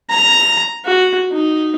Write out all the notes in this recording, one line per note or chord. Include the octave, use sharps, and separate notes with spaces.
A#5
F#4
D#4